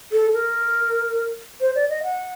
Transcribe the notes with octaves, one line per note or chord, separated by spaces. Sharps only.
A4
A#4
C5
D5
D#5
F#5